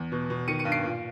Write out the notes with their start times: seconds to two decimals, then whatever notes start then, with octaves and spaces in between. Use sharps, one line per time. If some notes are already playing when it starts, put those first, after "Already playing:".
Already playing: E2
0.12 B2
0.30 B2
0.48 D#3 C#7 D#7
0.59 C#7 D#7
0.65 G2
0.72 C7 D7
0.84 A#2